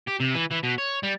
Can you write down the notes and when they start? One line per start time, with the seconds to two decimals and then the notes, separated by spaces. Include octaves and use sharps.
0.08 G4
0.21 C3
0.35 E3
0.51 E3
0.64 B2
0.78 C#5
1.03 G3